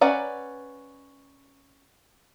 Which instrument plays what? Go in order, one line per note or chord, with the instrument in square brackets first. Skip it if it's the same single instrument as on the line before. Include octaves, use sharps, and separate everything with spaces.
[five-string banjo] C#4 B4 D5 F#5 A#5